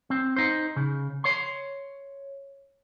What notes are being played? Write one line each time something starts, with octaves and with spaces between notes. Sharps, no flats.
C4
D#4 C5
C#3
C#5 C6